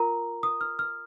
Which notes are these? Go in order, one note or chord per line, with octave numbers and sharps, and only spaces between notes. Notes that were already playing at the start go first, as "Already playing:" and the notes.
Already playing: F4 A#4 A#5
D#6
F6
F6